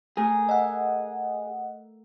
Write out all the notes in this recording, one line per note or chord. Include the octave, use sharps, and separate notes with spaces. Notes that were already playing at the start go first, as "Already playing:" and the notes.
A3 G#4 A#4
D#5 E5 F#5